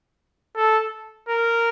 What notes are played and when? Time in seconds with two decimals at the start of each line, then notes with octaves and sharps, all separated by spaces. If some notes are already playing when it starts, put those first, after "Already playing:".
0.56 A4
1.28 A#4